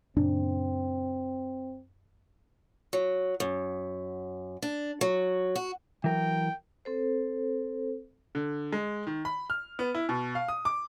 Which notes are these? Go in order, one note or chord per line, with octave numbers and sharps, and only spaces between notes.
F#2 A#2 C#3 C4 D4
F#3
F#2
D4
F#3
F#4
E3 F#3 A#4 G5
C4 A4 C5
D3
G#3
D#3
B5
F6
B3
E4
B2
F5
D#6
D6